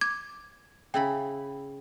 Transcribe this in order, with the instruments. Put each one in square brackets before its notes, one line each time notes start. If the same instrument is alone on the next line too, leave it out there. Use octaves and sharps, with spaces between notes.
[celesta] D6 [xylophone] G#6
[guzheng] C#3 E4 B5 [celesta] G5